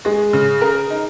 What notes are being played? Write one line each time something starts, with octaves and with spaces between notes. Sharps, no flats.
G#3 G#4
C#3
A#4
D#4